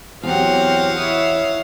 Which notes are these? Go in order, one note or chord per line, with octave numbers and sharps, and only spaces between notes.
E2 F#3 C4 F#4 G4 C5 F5 F#5
E4 C#5 D#6